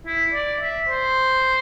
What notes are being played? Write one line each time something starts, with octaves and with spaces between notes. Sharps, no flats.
E4
D5
E5
C5